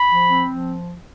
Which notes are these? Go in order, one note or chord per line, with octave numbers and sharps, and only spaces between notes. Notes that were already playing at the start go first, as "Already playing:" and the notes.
Already playing: B5
F3
C4
F3